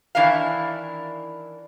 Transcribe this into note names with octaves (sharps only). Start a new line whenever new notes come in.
D#3 E3 D4 E4 A#4 F5